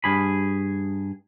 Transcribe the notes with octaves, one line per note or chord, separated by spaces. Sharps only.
G2 G#4 B5